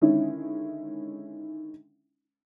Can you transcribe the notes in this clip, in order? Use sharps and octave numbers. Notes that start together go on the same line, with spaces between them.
D3 D#3 G#3 C#4 D#4 E4